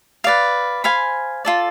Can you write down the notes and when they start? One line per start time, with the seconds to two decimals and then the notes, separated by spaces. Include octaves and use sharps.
0.24 B4 D5 F5
0.84 C5 F5 G#5 B5
1.45 F4 A4 D5